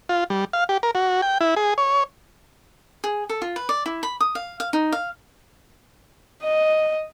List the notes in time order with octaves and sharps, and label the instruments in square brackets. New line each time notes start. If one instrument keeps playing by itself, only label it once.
[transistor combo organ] F4
G3
F5
G4
A#4
F#4
G5
E4
G#4
C#5
[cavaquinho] G#4
A4
F4
B4
D5
E4
B5
D#6
F5
F5
D#4
F5
[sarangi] D#5